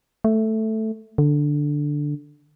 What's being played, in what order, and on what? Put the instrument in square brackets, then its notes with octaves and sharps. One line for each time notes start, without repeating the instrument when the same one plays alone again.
[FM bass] A3
D3